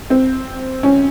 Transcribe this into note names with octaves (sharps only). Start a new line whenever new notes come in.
C4
C#4